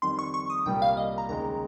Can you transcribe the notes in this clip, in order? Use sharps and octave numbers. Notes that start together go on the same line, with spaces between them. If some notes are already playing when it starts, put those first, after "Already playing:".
F2 D#3 G3 C6
C#6
C#6
D#6
C2 A#2 G3 A#3 G5
F5
D#5
A#5
D#2 C#3 G#3 A#5